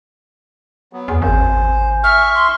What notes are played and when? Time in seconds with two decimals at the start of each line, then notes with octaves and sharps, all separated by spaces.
0.93 F#3 B3
1.08 E2 G#5
1.22 G#1 C5
2.04 E5 C#6 F6
2.35 C6